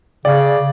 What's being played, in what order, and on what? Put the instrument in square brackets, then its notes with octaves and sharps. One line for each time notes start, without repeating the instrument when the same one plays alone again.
[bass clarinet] C#3 [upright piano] D5